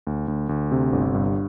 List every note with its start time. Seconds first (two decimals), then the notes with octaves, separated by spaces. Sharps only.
0.07 D2
0.28 D2
0.49 D2
0.72 C3
0.93 G1
1.15 G2